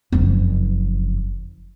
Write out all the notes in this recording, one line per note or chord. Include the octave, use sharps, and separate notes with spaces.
F#1 F2